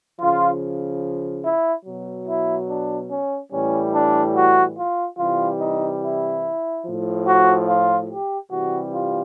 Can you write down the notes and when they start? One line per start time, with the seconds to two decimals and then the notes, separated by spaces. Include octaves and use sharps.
0.20 C#3 F3 F4
1.44 E4
1.86 B2 F#3
2.27 E4
2.69 D4
3.11 C#4
3.52 A2 E3 G3 C#4
3.94 D4
4.35 F#4
4.77 F4
5.18 C3 E3 G3 F4
5.60 D#4
6.02 E4
6.85 A2 F3
7.27 F#4
7.68 F4
8.09 G4
8.51 C3 E3 G3 F#4
8.93 F4